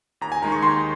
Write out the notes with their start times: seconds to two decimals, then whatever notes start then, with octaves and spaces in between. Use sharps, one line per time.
0.21 D#2 A#5
0.32 G#5
0.42 D#3 G#3 D#4 A#5
0.52 C#6
0.63 D#2 C6